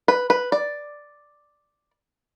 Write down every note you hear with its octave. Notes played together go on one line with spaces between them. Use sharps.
B4
B4
D5